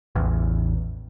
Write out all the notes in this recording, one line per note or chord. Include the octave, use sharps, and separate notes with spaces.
A1 E2